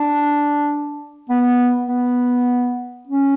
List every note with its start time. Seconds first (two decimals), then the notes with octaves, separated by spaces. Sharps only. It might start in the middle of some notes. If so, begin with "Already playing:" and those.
Already playing: D4
1.29 B3
1.88 B3
3.07 C#4